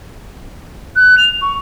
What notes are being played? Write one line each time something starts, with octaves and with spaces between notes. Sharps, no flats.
F#6
F7
C#6